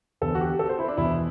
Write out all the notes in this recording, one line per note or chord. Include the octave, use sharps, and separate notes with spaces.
E2 D3 A4
F#4
G4
A4
C5
E4
D4
E2 B2 E4